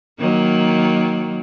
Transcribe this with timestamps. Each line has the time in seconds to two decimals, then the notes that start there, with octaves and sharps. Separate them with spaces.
0.20 D#3 F#3 A#3